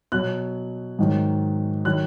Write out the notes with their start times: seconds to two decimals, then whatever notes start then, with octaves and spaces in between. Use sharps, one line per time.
0.12 B2 F#3 F#6
0.99 G#2 D#3 F#3
1.85 D#3 F#3 F#6